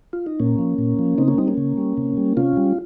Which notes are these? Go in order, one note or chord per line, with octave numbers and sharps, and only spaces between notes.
F4
D#4
A#2 A#3 C#4
F3
A#2
F3
C#3 C4 D#4
A#3 C#4
G3 C4 D#4
A#3 C#4
C#3
G3
C3
G3
C3 C#4 F4
G3